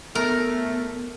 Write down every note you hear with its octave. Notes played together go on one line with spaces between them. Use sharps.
A3 B3 A#4